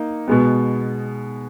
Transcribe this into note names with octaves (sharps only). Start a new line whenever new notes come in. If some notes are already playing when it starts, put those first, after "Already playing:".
Already playing: A#3 D#4
B2 G#3 B3